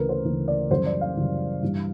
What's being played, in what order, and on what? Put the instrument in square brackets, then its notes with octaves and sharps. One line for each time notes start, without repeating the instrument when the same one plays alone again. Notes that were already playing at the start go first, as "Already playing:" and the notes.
Already playing: [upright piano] D2 C#3 E3 A#4 B4
C5
D2 C#3 E3
D5
F#2 C#3 E3 G3 C5
D5
F5
F#2 C#3 E3 G3
G2 E3 G3